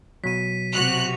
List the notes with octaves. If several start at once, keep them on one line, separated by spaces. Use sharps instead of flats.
B2 F#3 B6 D#7
C3 F#4 F#6 F7